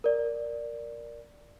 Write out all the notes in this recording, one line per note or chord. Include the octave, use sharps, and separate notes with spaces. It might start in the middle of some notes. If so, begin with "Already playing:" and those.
A#4 D5